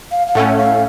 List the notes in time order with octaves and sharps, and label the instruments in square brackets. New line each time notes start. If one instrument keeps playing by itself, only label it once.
[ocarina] F5
F5
[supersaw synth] A2 A3 C#4 [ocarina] F#5
[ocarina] F5